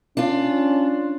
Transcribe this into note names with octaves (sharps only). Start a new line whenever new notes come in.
C#4 D4 F4